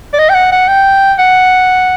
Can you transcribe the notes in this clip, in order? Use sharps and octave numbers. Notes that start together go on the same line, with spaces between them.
D5
D#5
G5
F#5
F#5
G5
F#5